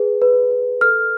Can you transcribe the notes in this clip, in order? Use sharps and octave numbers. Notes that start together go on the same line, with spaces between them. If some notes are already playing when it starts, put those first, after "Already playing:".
Already playing: G#4 B4
B4
B4
A4 F6